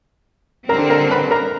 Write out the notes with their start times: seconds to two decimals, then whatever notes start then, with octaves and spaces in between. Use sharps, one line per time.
0.69 D3 G3 C4 A#4 A#5
0.90 A#4 A#5
1.11 B4 B5
1.31 A#4 A#5